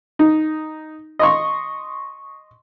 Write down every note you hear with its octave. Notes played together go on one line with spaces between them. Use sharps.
D#4
D#5 C6 C#6